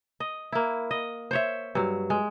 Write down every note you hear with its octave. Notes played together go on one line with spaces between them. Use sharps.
D#5
A#3 E4
D#5
C5 C#5 E5
G2 F#3
G#3